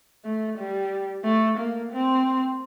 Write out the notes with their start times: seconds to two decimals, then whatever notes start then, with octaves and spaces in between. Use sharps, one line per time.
0.25 A3
0.58 G3
1.24 A3
1.58 A#3
1.92 C4